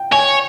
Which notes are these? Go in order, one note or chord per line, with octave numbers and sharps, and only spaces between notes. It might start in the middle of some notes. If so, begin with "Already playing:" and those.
Already playing: G5
C#5 G#5